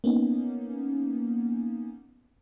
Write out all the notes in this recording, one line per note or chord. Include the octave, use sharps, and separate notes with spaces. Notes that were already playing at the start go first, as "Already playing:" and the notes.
A#3 B3 C#4 D#4